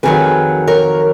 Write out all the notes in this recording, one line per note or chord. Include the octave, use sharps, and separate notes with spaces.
F2 D#3 F#3 G#4 B4
A#4 C#5